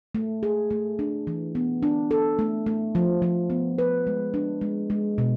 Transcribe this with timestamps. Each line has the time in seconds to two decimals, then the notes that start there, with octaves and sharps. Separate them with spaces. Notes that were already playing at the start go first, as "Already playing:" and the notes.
0.15 A3
0.43 G#4
0.71 A3
0.99 D4
1.27 E3
1.55 B3
1.83 D4
2.11 A4
2.39 A3
2.66 A3
2.95 F3
3.22 F3
3.50 B3
3.78 B4
4.07 G#3
4.34 D4
4.61 G#3
4.90 G#3
5.18 B2